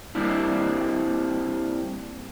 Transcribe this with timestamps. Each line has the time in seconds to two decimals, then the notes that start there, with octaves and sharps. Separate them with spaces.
0.15 G3 A#3 C4 D4 E4